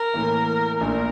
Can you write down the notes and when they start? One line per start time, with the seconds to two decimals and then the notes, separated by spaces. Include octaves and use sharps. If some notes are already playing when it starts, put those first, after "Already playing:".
Already playing: A#4
0.14 A2 E3 A#3
0.81 A#1 A#2 A3 D4 A#4